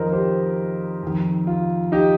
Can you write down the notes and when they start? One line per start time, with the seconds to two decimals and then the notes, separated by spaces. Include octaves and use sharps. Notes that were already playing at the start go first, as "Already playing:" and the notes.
Already playing: F2 D#3 F4 A#4 C5 D#5
0.13 G4 C5
1.03 F2 D#3
1.47 F4
1.92 D#4 G4